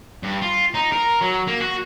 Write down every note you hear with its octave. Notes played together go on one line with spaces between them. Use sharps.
G2
F4
D#4
A#4
F#3
A#3
F#4